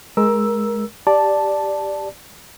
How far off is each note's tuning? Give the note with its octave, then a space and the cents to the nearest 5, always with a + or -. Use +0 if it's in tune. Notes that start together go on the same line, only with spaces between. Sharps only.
G#3 +15 A#4 +20 E6 +0
G4 +0 D5 +0 A5 +0